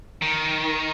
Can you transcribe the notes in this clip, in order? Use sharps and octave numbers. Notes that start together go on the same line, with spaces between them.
D#3